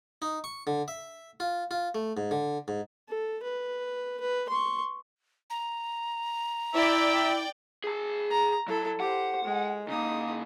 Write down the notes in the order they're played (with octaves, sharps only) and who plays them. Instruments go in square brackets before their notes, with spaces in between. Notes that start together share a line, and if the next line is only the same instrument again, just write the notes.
[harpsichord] D#4
C#6
D3
E5
F4
F4
A3
G#2
D3
G#2
[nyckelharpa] A4
B4
B4
C6 C#6
[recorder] A#5
[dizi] E4 [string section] D5 G5 [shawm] E5
[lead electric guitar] G#4 A5
[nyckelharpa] A#5
[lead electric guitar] F#3 [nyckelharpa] E4 A4
[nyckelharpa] G4 C5 [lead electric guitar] F#5
[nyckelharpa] G#3
[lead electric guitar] C#3 A#3 [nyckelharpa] D#4 D#6